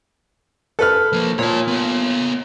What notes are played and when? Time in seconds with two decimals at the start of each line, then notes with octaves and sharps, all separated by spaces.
0.79 A4 B4 F6
1.13 F3 A#3
1.39 A#2 C#5 A5
1.68 B3 A4